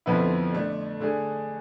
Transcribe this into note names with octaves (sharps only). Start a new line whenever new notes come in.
F2 D3 F3 B3 E4
D3 A3 D4
D3 A3 D4 G#4